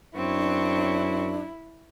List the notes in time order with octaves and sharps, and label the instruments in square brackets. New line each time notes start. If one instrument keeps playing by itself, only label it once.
[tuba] F#2 [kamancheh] C4 C#5 [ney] D4 [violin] E4